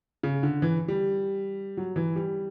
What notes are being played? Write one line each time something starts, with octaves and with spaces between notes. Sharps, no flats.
C#3
D3
E3
G3
F#3
E3
G3